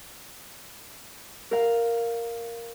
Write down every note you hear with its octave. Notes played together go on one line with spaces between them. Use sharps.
A#4 F5